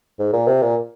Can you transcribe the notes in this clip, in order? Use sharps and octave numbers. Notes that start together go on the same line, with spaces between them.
G#2
A#2
C3
A#2